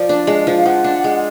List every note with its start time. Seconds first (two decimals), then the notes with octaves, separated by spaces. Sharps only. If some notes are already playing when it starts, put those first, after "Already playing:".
Already playing: F3 D5
0.09 D4
0.27 G#3
0.47 F3
0.57 F5
0.65 F3 F#5
0.84 D4
1.04 G#3